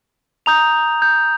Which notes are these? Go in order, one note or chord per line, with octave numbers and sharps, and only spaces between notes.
A#5 D#6 G6 F7
G6